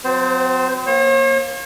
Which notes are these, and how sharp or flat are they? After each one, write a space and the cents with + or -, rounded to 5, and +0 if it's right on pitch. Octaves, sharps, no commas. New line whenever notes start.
F#3 -35 C4 -35 C5 +0
A#3 +20 C#5 -45